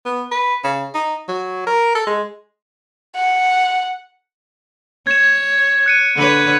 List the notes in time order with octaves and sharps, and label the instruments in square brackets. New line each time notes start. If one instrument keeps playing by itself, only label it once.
[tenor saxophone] B3
B4
C#3
D#4
F#3
A#4
A4
G#3
[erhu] F#5
[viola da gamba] C#5 [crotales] G#6 E7
[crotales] F#6 C#7 D#7
[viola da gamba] D3 B4 C#5